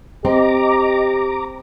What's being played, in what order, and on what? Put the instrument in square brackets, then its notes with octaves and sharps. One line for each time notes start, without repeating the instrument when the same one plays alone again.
[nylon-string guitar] C4 [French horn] G4 [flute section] D#5 [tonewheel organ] A#5 D6